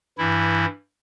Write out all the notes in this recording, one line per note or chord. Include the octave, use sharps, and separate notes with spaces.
G2 E3 E4